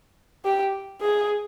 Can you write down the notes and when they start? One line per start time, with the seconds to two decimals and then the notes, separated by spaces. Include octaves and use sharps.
0.45 G4
1.02 G#4